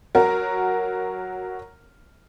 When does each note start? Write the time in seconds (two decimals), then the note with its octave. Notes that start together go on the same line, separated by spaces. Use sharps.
0.15 F#3 F#4 A#4